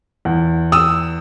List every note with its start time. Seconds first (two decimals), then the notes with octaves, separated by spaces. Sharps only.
0.25 E2
0.72 D#6 E6